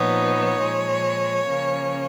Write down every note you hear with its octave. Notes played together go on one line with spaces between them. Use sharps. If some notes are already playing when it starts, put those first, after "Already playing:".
Already playing: A#2 F3 B3 D#4 C#5
A#2 F3 G#3
C#3 F3 A#3 C#4